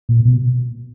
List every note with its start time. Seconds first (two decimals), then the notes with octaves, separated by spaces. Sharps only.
0.09 A#2
0.25 B2